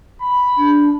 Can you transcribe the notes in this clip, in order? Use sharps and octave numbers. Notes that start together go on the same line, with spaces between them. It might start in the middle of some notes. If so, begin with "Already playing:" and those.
B5
D4